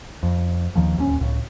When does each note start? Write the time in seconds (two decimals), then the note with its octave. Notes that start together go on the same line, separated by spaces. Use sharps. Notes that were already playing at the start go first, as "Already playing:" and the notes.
0.23 F2
0.75 D#2 D#3 F3
0.96 D1 D#2 C#3 C#4
1.20 C#2 A2 C#3